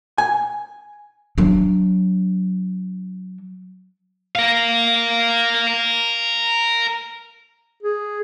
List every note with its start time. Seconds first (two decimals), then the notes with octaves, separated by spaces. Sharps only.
0.18 G#5
1.38 F#3 D4
4.36 A#4 F5
7.83 G#4